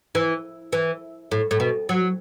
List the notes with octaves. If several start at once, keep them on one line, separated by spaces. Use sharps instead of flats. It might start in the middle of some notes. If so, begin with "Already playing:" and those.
E3
E3
A2
A2
B2
F#3